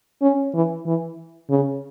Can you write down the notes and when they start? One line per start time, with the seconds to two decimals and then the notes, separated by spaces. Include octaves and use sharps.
0.22 C#4
0.54 E3
0.86 E3
1.50 C#3